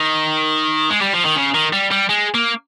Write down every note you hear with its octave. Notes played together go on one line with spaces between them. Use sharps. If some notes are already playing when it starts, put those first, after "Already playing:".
Already playing: D#3
G#3
G3
F3
D#3
C#3
D#3
G3
G3
G#3
A#3